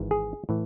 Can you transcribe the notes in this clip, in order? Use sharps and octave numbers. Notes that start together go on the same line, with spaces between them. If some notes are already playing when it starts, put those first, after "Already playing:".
Already playing: G#1 G#2 E3
G#4
A2 E3